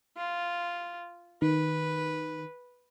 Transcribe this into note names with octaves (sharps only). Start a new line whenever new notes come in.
F4
D#3 B4